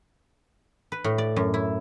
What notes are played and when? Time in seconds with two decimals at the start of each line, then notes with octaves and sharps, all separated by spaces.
0.92 B4
1.04 A2
1.18 D5
1.36 F#2
1.54 E4